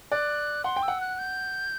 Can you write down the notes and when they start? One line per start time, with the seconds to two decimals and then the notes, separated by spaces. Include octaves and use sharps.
0.12 D5 F#6
0.64 F#5 C6
0.76 G5
0.83 E6
0.88 F#5
1.01 F#6
1.19 G6